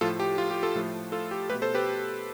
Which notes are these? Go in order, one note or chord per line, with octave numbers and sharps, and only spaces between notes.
A2 F3 A3 F4 A4
G4
F4
G4
F4 A4
A2 F3 A3
F4 A4
G4
B2 A3 G4 B4
A4 C5
G4 B4